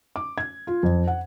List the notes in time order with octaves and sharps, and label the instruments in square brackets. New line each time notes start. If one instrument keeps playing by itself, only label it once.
[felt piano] D6
G#6
F4
F2
F#5